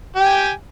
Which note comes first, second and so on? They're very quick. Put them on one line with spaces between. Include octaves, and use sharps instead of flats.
G4 G5 G#5